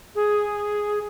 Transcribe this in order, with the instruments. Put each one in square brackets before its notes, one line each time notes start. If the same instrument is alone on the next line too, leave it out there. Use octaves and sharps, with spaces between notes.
[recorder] G#4